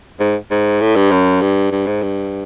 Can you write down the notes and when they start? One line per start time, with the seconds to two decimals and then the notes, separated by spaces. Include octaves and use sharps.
0.20 G#2
0.51 G#2
0.81 A2
0.96 G2
1.11 F#2
1.41 G2
1.71 G2
1.86 G#2
2.02 G2